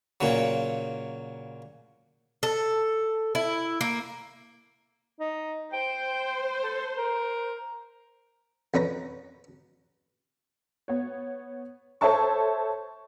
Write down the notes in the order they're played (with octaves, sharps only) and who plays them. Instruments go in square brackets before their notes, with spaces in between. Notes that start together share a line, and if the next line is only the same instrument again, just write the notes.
[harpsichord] A#2 C#3 F#3
[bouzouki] A4
E4
A#3
[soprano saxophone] D#4
[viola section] C5 [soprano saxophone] G5
[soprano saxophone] A4
A#4
[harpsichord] F2 C#4 B4 A#5
[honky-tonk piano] B3 C#5
A4 C5 C#5 E5 A5 C#6